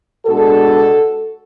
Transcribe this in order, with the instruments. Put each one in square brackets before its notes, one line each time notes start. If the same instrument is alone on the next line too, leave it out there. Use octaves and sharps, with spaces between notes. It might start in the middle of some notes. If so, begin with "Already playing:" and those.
[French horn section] B2 G#3 D4 F#4 A4